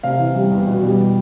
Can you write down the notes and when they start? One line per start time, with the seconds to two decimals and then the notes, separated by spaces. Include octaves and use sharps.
0.03 C3 F5
0.19 E3
0.35 G3
0.51 E2
0.67 B2
0.83 G3